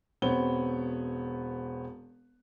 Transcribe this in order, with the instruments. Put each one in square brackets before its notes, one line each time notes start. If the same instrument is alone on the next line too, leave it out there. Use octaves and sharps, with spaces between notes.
[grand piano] E1 B3 C4 C#5 G7